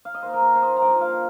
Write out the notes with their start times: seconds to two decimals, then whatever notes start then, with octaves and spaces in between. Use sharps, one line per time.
0.05 F5
0.15 D#5
0.23 D#3 A#3 C5
0.34 A#4
0.42 C5
0.56 C5
0.62 D#5
0.77 A#5
0.82 G2 F3 A#3 G5
1.01 F5